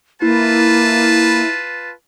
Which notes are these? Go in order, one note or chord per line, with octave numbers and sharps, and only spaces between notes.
A#3 E4 F4 B4 A5